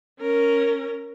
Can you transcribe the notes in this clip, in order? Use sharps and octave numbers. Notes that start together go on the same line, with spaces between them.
C#4 A#4